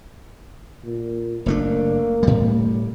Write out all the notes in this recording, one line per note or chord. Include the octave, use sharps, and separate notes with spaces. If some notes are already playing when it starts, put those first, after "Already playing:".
A#2
F#1 A3 A#3 D4
A2 G3